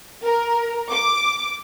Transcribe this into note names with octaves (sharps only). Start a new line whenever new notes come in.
A#4
D6